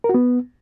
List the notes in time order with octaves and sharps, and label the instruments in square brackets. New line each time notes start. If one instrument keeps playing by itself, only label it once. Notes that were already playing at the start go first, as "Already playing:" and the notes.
[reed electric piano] A#4
F#4
B3